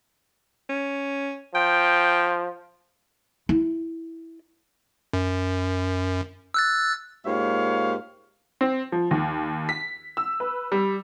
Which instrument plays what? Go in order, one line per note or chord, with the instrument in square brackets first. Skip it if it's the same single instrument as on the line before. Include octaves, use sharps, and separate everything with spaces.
[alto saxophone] C#4
[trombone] F3 [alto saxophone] G5
[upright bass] E4
[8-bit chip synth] F#2
E6 F#6 A6
[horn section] G#2 A#3 F4 G4 C#5 F5
[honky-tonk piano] C4
F3
D#2
B6
E6
B4
G3